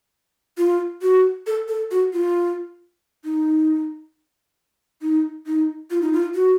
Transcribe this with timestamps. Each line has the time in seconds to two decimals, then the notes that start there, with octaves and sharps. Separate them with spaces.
0.58 F4
1.02 F#4
1.47 A4
1.68 A4
1.91 F#4
2.13 F4
3.24 D#4
5.02 D#4
5.46 D#4
5.91 F4
6.01 D#4
6.13 F4
6.35 F#4